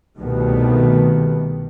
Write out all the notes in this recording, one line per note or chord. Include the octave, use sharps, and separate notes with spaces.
C2 B2 D#3 G3 A3 B3